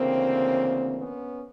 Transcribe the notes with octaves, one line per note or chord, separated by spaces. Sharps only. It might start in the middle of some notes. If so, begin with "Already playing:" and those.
Already playing: D2 C#3 E3 A#3 C4
B3 C#4